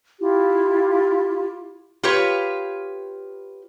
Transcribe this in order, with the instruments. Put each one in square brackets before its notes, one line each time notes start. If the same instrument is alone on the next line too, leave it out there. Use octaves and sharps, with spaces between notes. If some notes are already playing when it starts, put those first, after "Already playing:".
[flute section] E4 F4 G4
[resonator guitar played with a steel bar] F4 G4 B4 C#5